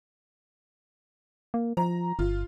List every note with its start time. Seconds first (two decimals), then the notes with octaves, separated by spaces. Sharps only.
1.54 A#3
1.77 F3 A#5
2.19 G1 F4